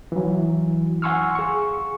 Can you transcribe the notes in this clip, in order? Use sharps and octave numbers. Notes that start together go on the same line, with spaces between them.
E3 F#3
F#5 G#5 C6 C#6 E6 F6
G#4 C#6